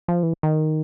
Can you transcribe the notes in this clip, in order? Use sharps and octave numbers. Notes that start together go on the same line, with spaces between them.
F3
E3
D#3